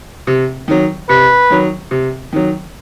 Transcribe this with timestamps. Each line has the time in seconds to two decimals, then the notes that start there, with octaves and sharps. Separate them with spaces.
0.27 C3
0.68 D#3 F#3
1.09 C3 B4
1.50 D#3 F#3
1.91 C3
2.33 D#3 F#3